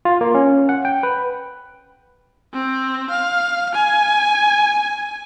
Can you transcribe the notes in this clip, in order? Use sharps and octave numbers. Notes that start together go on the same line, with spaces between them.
F4
A#3
C#4
F#5
G5
B4
C4
F5
G#5